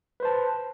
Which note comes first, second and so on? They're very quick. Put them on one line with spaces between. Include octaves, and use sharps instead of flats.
B4 C5 A5